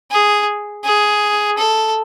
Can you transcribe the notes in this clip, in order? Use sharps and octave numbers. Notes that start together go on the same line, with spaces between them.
G#4
G#4
A4